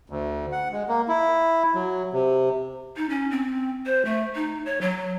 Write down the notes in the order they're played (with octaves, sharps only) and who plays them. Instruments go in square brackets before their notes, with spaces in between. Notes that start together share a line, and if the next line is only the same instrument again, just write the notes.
[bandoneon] D2
F#5
G#3
A#3
E4
F#3
C3
[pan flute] D#4
C#4
C4
C5
A3
D#4
C#5
F#3